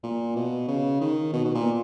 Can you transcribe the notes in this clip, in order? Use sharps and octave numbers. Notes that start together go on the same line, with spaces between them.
A#2
B2
C#3
D#3
B2
B2
A#2